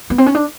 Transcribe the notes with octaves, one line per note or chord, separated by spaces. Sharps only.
B3
C4
C#4
D4